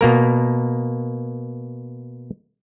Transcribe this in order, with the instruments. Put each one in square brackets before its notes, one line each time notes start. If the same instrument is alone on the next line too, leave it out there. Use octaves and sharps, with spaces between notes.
[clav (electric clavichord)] B2 A#3 A#4